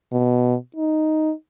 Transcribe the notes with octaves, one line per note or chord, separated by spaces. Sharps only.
B2
D#4